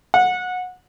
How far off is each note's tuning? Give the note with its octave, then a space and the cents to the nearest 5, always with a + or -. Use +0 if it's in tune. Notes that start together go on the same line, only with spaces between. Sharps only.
F#5 -20